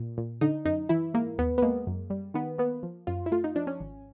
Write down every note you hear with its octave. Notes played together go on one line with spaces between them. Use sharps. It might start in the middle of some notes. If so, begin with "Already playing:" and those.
Already playing: A#2
A#2
D3 D#4
F#2 D#4
E3 E4
G#2 A#3
D#2 B3
B3
G#3 A#3
F#2
G3
D#3 B3
A#3 B3
F3
F#2 F4
E4
A3 F4
D#4
F3 D4
C#4
G#1